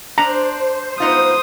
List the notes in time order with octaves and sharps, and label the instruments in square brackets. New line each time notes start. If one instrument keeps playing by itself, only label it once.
[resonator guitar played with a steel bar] D4 [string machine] C5 [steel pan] A#5
[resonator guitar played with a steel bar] B3 D#4 F4 [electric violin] D#6